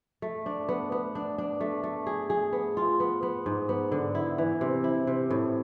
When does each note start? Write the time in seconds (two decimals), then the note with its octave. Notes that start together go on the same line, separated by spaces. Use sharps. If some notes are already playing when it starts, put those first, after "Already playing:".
0.22 A3
0.46 D4
0.69 B3
0.92 B3
1.15 D4
1.38 D4
1.61 A3
1.84 A3
2.06 G#4
2.30 G#4
2.53 B3
2.77 F4
3.00 B3
3.23 B3
3.46 G#2
3.69 B3
3.92 D3
4.15 E4
4.38 E3
4.61 C3
4.84 E4
5.07 C3
5.30 A2